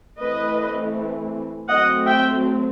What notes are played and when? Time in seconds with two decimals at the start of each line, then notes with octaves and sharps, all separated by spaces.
0.20 E3 A3 C4 B4 D#5
1.69 F#3 A3 C4 D#5 F#5
2.07 E5 G5